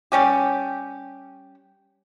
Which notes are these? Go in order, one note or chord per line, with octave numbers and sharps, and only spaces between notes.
G3 C#4 G4